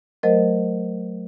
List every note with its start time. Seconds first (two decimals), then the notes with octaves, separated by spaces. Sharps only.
0.23 F#3 A3 A#4 C5 D#5